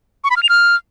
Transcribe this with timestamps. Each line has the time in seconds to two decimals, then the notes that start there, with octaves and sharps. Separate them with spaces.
0.24 C#6
0.30 B5
0.37 F6
0.43 F7
0.49 F6